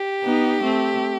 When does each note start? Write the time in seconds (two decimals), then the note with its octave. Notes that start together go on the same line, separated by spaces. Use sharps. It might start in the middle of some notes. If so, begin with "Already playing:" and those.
Already playing: G4
0.23 B3 D#4
0.62 A3 C4